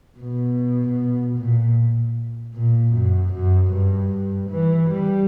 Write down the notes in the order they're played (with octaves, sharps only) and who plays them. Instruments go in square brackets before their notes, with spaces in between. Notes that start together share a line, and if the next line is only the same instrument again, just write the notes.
[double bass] B2
A#2
A#2
F#2
F#2
G2
E3
G3